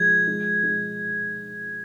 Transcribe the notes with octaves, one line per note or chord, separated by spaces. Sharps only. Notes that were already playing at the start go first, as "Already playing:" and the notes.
Already playing: F3 G#3 G#6
G#3
G#3